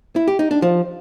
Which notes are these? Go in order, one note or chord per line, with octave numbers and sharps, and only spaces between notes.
E4
G4
D#4
D4
F3